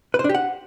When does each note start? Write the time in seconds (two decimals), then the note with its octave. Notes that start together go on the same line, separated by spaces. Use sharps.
0.14 B4
0.19 C5
0.24 D4
0.29 G4
0.35 F#5